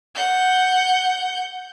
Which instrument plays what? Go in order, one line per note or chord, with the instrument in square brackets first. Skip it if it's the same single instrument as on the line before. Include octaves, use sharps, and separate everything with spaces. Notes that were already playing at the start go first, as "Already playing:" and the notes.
[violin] F#5 G6